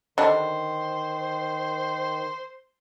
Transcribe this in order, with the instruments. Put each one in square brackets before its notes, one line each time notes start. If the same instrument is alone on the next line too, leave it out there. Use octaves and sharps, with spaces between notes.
[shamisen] D3 G3 D4 [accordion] D#3 [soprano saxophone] C5 [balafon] D#5